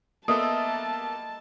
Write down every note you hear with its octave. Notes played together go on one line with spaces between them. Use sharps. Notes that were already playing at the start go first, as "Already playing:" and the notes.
A#3 B3 A4 D#5 E5 A5 C6 D#6